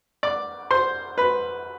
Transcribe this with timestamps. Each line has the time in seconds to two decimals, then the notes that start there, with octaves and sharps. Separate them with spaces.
0.23 D5 D6
0.71 C5 C6
1.18 B4 B5